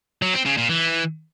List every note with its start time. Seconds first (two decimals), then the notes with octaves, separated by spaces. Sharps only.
0.22 F#3
0.34 C4
0.46 C#3
0.57 A#2
0.69 E3